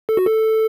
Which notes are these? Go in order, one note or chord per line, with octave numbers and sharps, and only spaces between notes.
A4
F#4
A4